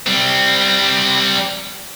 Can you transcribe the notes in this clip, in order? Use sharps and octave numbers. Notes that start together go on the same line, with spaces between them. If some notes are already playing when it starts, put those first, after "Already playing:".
G3 C4